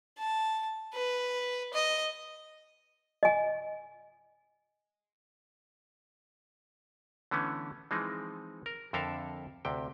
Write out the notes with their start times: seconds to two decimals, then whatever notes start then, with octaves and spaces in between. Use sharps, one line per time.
0.18 A5
0.94 B4
1.73 D#5
3.23 D#5 G#5
7.31 D3 E3 A3 B3 C#4
7.91 E3 F3 G#3 C4 D#4
8.66 A#4
8.93 F2 D3 A4 A#4 E5 F5
9.65 D2 C3 G5